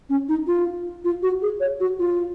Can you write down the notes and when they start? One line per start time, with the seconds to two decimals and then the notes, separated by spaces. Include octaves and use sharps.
0.09 C#4
0.28 D#4
0.47 F4
1.04 F4
1.22 F#4
1.42 G#4
1.60 C#5
1.80 F#4
1.99 F4